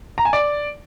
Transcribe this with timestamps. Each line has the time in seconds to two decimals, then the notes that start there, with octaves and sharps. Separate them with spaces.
0.18 A#5
0.25 G#5
0.33 D5